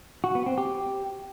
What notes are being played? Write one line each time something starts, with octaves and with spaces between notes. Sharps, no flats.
F#4
B3
C4
G4